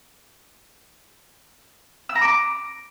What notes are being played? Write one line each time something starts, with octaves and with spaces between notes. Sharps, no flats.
E6
A#5
D6